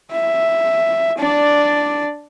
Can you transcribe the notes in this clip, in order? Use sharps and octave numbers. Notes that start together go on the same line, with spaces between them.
E5
D4 D5